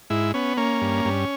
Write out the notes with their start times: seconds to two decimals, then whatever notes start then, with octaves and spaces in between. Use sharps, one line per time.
0.10 G#2 E4
0.34 B3 C#4
0.57 A#3 C#4
0.81 G2
1.05 G2